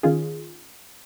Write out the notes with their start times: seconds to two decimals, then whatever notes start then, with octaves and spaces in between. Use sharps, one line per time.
0.03 D#3 C#4 D#4 F4 G#4